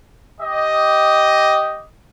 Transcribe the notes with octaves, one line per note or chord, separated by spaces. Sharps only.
G4 D#5